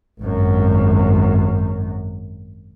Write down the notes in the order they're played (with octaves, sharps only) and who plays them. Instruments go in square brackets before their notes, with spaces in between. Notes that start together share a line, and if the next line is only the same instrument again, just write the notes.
[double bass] G#1 F#2